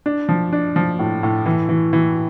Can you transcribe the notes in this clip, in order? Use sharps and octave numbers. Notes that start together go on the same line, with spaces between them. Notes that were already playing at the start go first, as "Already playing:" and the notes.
D4
F3
D4
F3
A2
A2
E3
E3
E3